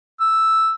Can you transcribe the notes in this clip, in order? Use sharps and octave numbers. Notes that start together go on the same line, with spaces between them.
E6